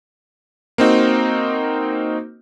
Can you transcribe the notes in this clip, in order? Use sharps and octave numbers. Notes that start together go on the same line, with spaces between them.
A#3 C4 D#4 F#4